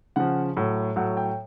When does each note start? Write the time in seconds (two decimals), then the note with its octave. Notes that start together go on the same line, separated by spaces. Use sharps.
0.16 C#3 F3 F#5
0.56 A2 F#3
0.96 A2 F#3 F#5
1.17 G5